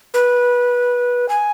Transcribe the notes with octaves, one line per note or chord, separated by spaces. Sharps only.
B4
G#5